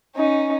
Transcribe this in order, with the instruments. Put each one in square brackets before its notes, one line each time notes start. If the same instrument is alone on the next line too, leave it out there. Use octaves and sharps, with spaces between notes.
[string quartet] C#4 D#4